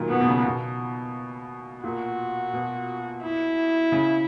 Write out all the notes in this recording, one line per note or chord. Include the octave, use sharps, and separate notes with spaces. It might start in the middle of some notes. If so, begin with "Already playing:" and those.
Already playing: A#2 D#3 F#3
B2 B3
B2
C#3
B2
A#2 F#4
B2
E4
C#3